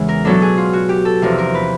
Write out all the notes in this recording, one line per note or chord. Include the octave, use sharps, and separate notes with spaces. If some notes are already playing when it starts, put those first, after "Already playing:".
Already playing: E2 C#3 E3 G#3
A#4
B2 F#3 B3 D4 A4
G#4
F4
F#4
G4
A4
E2 C3 F3 A#4
A#4
B4